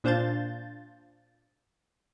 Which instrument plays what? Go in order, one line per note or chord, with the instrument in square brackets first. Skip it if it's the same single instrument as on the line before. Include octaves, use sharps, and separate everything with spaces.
[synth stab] A#2 D4 C5 F5 G6 A6